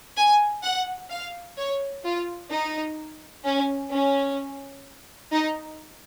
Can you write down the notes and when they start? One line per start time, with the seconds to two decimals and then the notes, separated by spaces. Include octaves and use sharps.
0.16 G#5
0.63 F#5
1.10 F5
1.57 C#5
2.04 F4
2.51 D#4
3.44 C#4
3.91 C#4
5.32 D#4